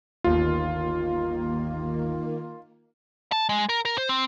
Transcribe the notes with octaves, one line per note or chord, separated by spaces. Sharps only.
G1 D#2 D#3 A#3 F4
A5
G#3
A#4
A#4
C5
C4